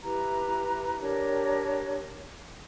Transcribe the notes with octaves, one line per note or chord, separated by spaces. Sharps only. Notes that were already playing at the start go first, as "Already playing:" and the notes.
E4 G4 B4 A#5
D4 G4 A#4 C#5